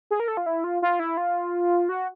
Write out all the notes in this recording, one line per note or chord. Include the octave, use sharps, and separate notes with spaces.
G#4
A#4
A4
F4
E4
F4
F4
E4
F4
F#4